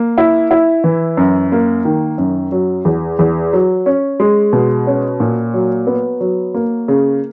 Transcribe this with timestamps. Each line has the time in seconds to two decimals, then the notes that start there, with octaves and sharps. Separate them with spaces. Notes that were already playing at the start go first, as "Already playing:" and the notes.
Already playing: A#3
0.18 E4
0.51 E4
0.84 E3
1.17 F#2
1.52 A#3
1.85 D#3
2.18 F#2
2.52 F#3
2.85 E2
3.19 E2
3.53 F#3
3.86 C#4
4.20 G#3
4.53 B2
4.87 C#4
5.20 A#2
5.54 F#3
5.87 B3
6.21 F#3
6.54 A#3
6.88 C#3